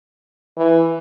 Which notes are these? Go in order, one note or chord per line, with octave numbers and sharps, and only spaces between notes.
E3